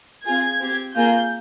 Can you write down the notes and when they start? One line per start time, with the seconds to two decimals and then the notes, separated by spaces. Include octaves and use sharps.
0.25 C4 F4 G#4 G#6
0.60 C4 G4
0.94 A#3 F4 G#4 G6